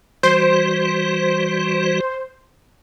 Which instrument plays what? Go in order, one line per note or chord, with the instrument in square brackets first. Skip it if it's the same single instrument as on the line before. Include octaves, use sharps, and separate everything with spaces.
[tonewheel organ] E3 G3 F#4 [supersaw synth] C5